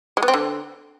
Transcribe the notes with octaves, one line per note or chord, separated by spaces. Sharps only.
G#3
B3
C4
D3